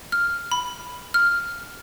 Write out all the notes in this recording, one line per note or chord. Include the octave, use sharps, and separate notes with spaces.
F6
B5
F6